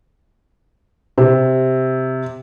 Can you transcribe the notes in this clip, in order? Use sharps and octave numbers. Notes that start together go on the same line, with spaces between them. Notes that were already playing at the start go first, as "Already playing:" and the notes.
C3